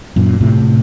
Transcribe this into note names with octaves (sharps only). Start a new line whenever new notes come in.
F#2 A#2
A2 C3